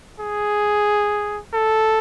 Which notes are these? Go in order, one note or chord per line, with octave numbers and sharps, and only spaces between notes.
G#4
A4